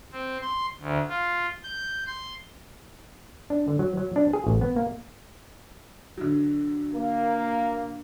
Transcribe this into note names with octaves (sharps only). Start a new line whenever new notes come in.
C4
C6
D2
F4
G6
C6
D4
D3
F#3
F#3
D4
G#4
A1
B3
A#3
D3 F#3
A#3